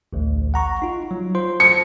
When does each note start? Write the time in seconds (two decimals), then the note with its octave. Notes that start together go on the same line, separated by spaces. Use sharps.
0.13 A1 D2
0.54 F#5 A#5 C#6
0.82 D#4 F4
1.11 F#3
1.35 F4 C5 C6
1.60 C#7